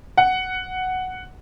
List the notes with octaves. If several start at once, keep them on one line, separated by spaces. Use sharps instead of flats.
F#5